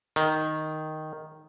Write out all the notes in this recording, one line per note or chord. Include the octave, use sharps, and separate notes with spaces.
D#3